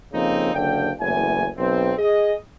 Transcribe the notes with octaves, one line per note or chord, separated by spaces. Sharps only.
F2 C#3 A#3 C4 D#4
F#1 D3 F5 G5
F#1 E2 A2 G#5
B1 C4
G#4 D#5